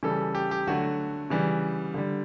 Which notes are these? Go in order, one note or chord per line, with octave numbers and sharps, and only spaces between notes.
C#3 E3 G3 A4
G4
G4
D3 F#3 A3 F#4
C#3 E3 G3
D3 G3